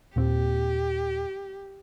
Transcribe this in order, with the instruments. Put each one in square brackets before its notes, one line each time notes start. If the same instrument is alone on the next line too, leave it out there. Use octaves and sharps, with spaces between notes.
[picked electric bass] D#2 A#2 C4 [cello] G4